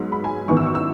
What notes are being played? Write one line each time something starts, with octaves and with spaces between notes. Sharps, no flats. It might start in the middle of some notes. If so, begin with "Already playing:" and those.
Already playing: G#2 F#3 B3
B5
G#5
G#1 F#2 E3 B3 C#6
E6
C#6
E6